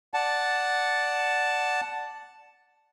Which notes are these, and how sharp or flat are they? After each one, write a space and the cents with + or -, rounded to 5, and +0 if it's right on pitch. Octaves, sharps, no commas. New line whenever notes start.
D5 +0 F#5 +0 A5 +0